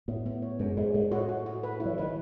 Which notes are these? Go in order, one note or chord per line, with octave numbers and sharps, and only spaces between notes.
A2 B3
B3
C#5
F#2 G#3
G#2 G#3
G#2 G#3
A2 F#4
F#4
F#4
B4
E4
F#3
E3
D#3 B4